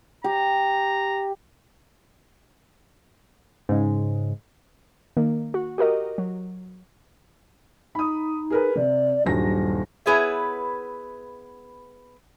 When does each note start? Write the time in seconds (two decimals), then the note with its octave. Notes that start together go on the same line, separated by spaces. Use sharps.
0.24 G4 A#5
3.69 G#2 C#3 G#3
5.17 D#3 A#3
5.54 F#4
5.78 F#4 G4 A#4 D#5
6.18 F#3
7.95 D#4 B5 D#6
8.50 G#4 A#4 B4
8.76 C3 D5
9.26 D#1 G2 F#3 A#6
10.06 B3 E4 G#4 B4 C#5 E5